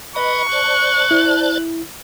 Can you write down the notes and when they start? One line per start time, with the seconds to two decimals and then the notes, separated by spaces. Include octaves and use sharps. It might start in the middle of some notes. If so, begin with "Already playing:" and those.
0.16 B4 D#5 C#6
0.52 C5 D5 A5 F#6
1.11 E4